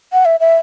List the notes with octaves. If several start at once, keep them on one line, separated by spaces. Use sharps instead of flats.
F#5
E5
E5